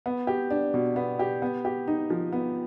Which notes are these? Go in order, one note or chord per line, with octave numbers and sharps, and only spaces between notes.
B3
G4
D4
B2
B3
G4
B3
G4
D#4
F3
B3